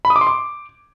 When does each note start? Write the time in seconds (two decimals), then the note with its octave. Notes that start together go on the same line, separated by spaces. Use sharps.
0.05 B5
0.10 D#6
0.16 D6
0.21 C6
0.27 D6